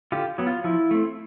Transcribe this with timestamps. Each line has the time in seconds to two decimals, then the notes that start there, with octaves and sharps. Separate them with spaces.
0.12 D3 F4 G4
0.38 F#3 B3
0.47 F4
0.64 F3 E4
0.91 A3 C4